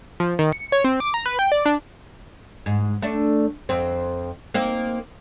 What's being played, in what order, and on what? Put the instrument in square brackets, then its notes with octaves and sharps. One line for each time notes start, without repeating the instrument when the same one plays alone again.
[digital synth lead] F3
D#3
C#7
C#5
C4
D6
A#5
B4
G5
D5
D4
[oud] G#2
A3 D4
F2 C4
A#3 C4 D#4